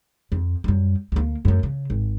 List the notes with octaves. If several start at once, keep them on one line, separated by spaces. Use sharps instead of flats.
F2
F#2 G3
D2 A#3
F#2 A3
C#3
G#1